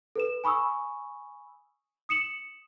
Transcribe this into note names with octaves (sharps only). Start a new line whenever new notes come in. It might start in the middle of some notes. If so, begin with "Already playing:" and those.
A4 B4 E7
G#5 B5 C#6 D#6 E6
D#6 C#7 E7 F#7